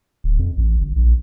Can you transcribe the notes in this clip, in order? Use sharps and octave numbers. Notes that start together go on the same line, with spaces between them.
D1
F2
A1
G1
A#1